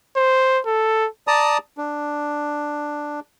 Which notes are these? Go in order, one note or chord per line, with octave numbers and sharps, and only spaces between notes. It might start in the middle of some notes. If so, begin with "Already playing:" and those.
C5
A4
D5 A5 A#5 D#6
D4